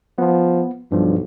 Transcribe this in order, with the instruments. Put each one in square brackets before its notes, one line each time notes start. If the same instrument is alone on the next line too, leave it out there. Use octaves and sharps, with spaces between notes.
[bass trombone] F3 [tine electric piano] B3
[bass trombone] B1 [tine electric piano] G2 F3